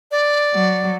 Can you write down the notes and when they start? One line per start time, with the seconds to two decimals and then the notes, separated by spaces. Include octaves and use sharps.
0.11 D5
0.54 F#3